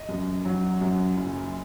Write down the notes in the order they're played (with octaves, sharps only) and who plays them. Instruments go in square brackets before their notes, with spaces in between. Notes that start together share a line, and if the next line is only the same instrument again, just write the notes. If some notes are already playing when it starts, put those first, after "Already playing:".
Already playing: [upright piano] D#5
F#2
F#3
F#2
F#1